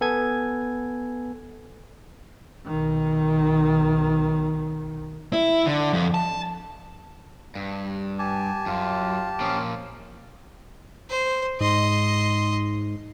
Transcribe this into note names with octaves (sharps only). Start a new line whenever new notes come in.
B3 A4 G#5 G#6
B1 D#3
E4
D3
F2
A5
G2
G4 G#5 A5
F#2 F4
A#2 F3 C#4
C5
G#2 D#5 C6